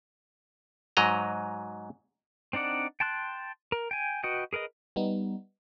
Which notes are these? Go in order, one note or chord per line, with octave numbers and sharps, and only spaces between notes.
G#2 F#3 D#5 A#5
C4 D4 D#4 D5 F#5
G5 A5 C6 F#6
A#4
G5 G#5
F#4 B4 D#5 G5
G#4 A#4 B4 D#5
G3 B3 D#4